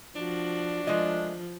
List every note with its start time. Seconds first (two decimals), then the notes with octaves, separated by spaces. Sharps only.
0.16 F3 D4 F#4
0.87 F3 G#3 A3 D#5